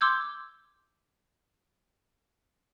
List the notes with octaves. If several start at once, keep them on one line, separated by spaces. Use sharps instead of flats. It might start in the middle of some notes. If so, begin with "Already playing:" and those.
C6 D6 E6 G6 G#6